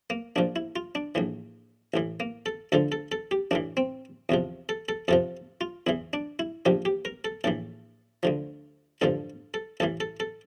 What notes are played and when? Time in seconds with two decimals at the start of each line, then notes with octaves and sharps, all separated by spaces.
0.10 A#3
0.36 A#1 A#2 F3 D4
0.56 E4
0.76 F4
0.95 D4
1.15 A#1 A2 E3
1.94 A1 A2 E3
2.20 A#3
2.46 A4
2.72 D2 D3 F3 A4
2.92 A4
3.12 A4
3.31 G4
3.51 A1 A2 E3 D4
3.77 C4
4.29 E2 C3 F3
4.69 A4
4.89 A4
5.08 F2 C3 F3 A4
5.61 F4
5.87 E2 E3 E4
6.13 D4
6.39 E4
6.65 A#1 A#2 F3 G4
6.85 G4
7.05 A#4
7.25 A4
7.44 A#1 A2 E3 A4
8.23 D2 D3 F3
9.01 A1 G2 D3 F3 A4
9.54 A4
9.80 A1 A2 E3 A4
10.00 A4
10.20 A4